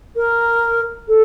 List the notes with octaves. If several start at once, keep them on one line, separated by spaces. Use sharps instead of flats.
A#4
A4